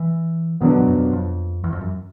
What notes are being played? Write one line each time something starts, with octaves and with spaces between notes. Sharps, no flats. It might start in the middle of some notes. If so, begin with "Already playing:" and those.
Already playing: E3
B2 D#3 F#3 B3 D4
D3
G#2
F#2
F2
F2
E2
F2
F#2